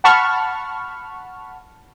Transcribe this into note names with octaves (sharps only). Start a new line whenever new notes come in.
F#5 A5 B5 C#6 F6